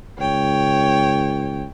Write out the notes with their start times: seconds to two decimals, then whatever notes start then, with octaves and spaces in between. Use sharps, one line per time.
0.19 C#2 C#5 G5